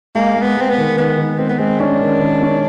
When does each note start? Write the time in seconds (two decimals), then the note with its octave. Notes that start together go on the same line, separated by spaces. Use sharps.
0.15 G#3 A#3
0.36 G#3
0.42 B3
0.56 G#3 C4
0.70 B3
0.78 D#3
0.98 D#3 B3
1.18 D#3
1.38 G#3 C4
1.49 B3
1.59 G#3 C4
1.80 C#4 D4
2.01 D#3
2.21 D#3
2.42 C#4